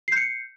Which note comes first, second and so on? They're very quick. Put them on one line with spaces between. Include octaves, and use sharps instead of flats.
C7 G6 C#7